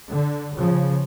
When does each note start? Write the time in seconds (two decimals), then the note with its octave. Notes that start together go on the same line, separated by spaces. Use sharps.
0.11 D3
0.57 C#3 F3